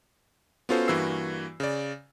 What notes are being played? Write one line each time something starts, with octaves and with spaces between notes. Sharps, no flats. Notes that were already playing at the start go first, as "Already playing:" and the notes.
B3 C#4 F4 F#4 A4 C5
G2 E3 A#3 F#4 E6 C7
C#3 D5